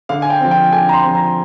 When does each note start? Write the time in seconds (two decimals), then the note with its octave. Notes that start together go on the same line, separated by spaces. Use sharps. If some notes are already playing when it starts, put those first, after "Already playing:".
0.09 D3 F5
0.22 G#5
0.30 G5
0.41 F3 C4
0.51 G5
0.72 D3 G#5
0.89 A#5
0.93 C6
1.04 F3 C4
1.15 A#5